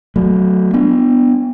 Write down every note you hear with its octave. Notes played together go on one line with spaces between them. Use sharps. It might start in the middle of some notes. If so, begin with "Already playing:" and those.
F#3 A3
B3 D4